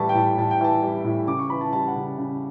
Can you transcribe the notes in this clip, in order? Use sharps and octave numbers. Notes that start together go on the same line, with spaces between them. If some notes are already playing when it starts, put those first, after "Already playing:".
Already playing: A2 E3 G3 E5 A5 C#6
G5
A2 A5
A2 A5
G5
E3 A5
G3
A2
C#3 D6
C#6
E3 B5
A5
G3 A5
F#5
C#3
C#3